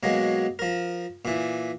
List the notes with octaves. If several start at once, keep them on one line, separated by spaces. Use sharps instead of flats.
B2 F#3 G#3 A#3
F3 A#4
A#2 E3